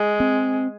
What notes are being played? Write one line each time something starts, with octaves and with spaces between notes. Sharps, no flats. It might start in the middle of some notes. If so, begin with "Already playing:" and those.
Already playing: G#3
C4